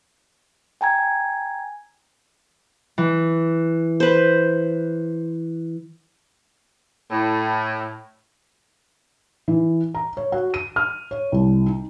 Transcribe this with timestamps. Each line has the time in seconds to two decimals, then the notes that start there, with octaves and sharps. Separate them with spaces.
0.81 G5 G#5 A#5 G#6
2.98 E3
4.00 B4 C5
7.10 A2
9.48 E3
9.95 A#5
10.17 C#5
10.32 F#4
10.54 D#7
10.76 F6
11.11 C#5
11.32 C2
11.66 D#4